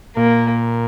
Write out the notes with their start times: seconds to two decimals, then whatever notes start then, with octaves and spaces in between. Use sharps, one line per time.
0.17 A#2 A#3